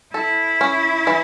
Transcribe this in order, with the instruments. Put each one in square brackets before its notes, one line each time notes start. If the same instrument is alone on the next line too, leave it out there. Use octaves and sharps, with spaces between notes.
[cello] E4 [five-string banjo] A4
[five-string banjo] C#4
E3